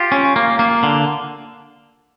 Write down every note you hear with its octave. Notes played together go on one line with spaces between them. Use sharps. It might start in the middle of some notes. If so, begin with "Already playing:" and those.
Already playing: F4 G4
C#4
A#3
A#3
D3